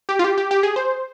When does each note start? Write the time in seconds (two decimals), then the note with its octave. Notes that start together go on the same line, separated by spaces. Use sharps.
0.09 G4
0.19 F4
0.24 G4
0.38 G4
0.51 G4
0.63 G#4
0.76 C5